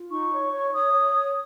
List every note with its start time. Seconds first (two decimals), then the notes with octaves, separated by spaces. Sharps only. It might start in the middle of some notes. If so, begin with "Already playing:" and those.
Already playing: F4
0.10 D#4 C#6
0.32 C#5
0.52 C#5
0.73 C#5 D#6
0.93 C#5
1.15 C#5